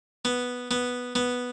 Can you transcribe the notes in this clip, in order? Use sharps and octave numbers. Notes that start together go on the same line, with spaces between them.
B3
B3
B3